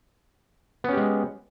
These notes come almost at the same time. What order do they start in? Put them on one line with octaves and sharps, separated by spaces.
B3 C#4 G4 G#3